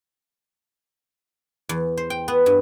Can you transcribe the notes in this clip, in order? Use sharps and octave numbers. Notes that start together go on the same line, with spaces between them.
E2
C5
G5
B3
G2